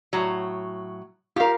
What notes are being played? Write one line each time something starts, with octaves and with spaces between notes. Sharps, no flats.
A2 F#3
F4 G4 A#4 F5